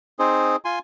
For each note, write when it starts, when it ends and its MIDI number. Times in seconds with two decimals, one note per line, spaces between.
0.19 0.56 60
0.19 0.56 63
0.19 0.56 68
0.19 0.56 72
0.65 0.79 65
0.65 0.79 80
0.65 0.79 84